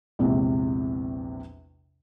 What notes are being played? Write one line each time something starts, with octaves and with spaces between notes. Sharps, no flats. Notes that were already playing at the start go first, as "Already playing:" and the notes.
A#1 E2 C3 G#3